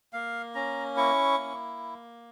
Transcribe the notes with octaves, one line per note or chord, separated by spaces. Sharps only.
A#3 F5
C#4 A#5
E4 C#6
A#3